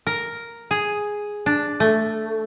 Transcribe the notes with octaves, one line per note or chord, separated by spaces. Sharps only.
A#4
G#4
D4
A3